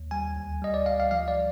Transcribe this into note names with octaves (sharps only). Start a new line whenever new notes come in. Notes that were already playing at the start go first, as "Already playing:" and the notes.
Already playing: D#2
G3 G#5
D2
G3 D#5
D5
D2 F5
F5
F3 F5
D5